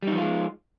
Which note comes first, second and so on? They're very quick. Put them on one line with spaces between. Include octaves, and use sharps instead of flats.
G3 D#4 F3 F4 G#3